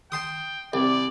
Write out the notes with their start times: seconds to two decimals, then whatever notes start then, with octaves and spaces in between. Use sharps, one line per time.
0.12 G5 A5 C6 D#6
0.73 C2 D5